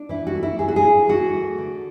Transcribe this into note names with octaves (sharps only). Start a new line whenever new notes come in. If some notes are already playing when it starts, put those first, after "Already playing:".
Already playing: D4
E3 E4
F#4
A3
E4
E3 G#4
F#4
G#4
E4
E3 F#4
A3
D3